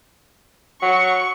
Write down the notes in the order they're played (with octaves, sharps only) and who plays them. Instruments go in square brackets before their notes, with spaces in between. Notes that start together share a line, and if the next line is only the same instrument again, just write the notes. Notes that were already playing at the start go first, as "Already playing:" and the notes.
[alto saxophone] F#3 [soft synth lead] F#5 [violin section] C#6